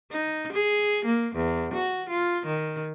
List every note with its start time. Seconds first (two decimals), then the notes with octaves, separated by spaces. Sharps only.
0.12 D#4
0.53 G#4
1.05 A#3
1.35 E2
1.74 F#4
2.09 F4
2.46 D#3